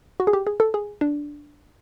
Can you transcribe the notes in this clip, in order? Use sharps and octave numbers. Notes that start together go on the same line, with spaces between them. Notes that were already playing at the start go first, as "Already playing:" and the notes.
F#4
G#4
G4
G#4
A4
G#4
D4